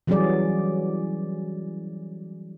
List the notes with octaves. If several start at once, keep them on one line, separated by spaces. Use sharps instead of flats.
E3 F#3 G3 C#4 G#4 D5